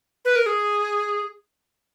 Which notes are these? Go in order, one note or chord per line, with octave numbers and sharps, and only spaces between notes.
B4
A#4
G#4